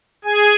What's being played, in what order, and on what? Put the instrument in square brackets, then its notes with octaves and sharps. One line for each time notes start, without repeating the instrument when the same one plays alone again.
[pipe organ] G#4 G#5